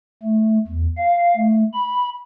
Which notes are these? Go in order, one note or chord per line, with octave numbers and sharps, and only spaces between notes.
A3
E2
F5
A3
B5